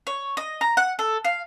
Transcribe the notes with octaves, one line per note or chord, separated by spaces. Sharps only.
C#5
D#5
A#5
F#5
A4
F5